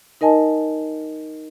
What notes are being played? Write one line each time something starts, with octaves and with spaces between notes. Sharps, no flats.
D#4 A#4 D#5 G#5 A5